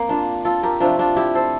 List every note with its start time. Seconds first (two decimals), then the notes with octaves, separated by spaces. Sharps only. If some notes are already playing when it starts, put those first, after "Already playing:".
Already playing: A#3 C4
0.09 D4 F4
0.45 F4 A4
0.63 G4 A#4
0.80 C3 F3 A3 D4 F4
0.99 D4 F4
1.16 E4 G4
1.35 A4 C5